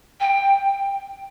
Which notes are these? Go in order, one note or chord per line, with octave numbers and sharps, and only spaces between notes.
G5